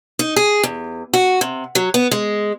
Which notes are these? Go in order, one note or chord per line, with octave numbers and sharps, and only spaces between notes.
D#4
G#4
E2
F#4
C3
F#3
B3
G#3